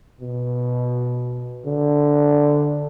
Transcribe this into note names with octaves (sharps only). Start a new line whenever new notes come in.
B2
D3